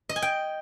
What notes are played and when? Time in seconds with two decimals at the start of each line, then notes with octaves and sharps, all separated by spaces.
0.09 D#5
0.16 G#5
0.22 G5